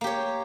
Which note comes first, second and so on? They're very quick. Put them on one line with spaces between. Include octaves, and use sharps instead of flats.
A#3 G4 C#5